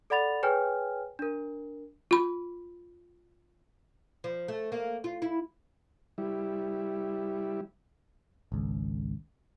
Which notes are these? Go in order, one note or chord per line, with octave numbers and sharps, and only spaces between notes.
A4 D5 F#5 B5 A6 F7
G#4 B4 C#5 G5 G#5 F6
D4 A#4
F4 B5
F3
A3
A#3
F4
E4
G3 E4
G#1 C#2